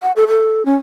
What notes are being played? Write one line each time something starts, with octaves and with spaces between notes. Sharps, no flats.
F#5
A4
A4
C#4